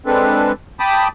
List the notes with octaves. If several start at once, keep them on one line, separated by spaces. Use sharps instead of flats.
G#3 C4 D4 A4 B4
G5 A5 B5 D6 D#6